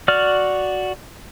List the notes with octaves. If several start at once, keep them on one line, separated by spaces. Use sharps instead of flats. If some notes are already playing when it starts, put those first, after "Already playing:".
F#4 D5 F6